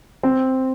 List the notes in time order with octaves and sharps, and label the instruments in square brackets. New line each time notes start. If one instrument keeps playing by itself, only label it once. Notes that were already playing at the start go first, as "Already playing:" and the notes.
[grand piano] C4